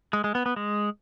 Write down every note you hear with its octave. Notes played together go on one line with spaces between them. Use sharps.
G#3
G#3
B3
B3
G#3